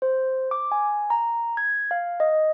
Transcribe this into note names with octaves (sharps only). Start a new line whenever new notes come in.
C5
D6
G#5
A#5
G#6
F5
D#5